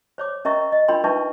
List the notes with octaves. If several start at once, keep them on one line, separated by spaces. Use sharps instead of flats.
C5 C#5 D6
C#4 A#4 D#5 E5 A#5 C#6
D#5
D4 F4 A#4 G5 B5 C6
D4 D#4 B4 E5 A5 C#6